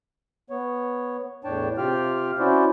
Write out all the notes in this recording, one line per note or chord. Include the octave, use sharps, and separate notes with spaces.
B3 C#5
E2 A2 D4 C#5 G5 A5
C3 F4 G4 F5 G5 F6
C#4 E4 F#4 C5 D5